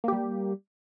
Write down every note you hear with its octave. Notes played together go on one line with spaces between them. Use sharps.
G3 A#3 G4